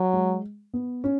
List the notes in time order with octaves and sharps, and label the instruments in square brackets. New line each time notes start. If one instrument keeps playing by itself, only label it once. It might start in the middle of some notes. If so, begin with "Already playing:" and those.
Already playing: [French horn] F#3
[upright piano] G#3
B3
C#4